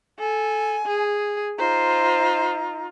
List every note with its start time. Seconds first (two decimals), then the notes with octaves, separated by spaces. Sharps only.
0.19 A4 G#5
0.85 G#4
1.58 D#4 F4 C5 A#5